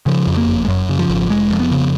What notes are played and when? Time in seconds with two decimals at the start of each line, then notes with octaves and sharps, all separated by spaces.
0.06 C#3 F3
0.27 F2
0.37 A#3
0.48 F#1
0.65 G#3
0.68 F#2 F#3
0.89 C#3
0.99 F3
1.09 G#1
1.30 F1 G#3
1.51 F2
1.60 B3
1.71 C#3